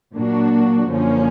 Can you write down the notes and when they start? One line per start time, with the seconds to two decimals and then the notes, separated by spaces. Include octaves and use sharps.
0.15 A#2 F#3 A#3 D4 F#4
0.89 F#2 D3 F3 A#3 C#4